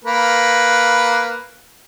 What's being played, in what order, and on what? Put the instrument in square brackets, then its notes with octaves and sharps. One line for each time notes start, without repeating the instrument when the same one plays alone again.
[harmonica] A#3 B4